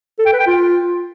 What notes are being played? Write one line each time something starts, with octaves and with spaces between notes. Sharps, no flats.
A4
G5
B4
G5
F4